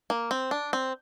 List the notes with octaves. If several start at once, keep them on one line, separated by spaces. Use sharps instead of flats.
A#3
C4
D4
C4